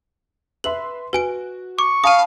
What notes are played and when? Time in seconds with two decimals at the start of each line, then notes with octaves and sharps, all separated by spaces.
0.64 B4 E5 C6 F#7
1.13 F#4 B4 G#5 D7
1.79 C#6 D6
2.04 F5 A5 B5 D#6 D#7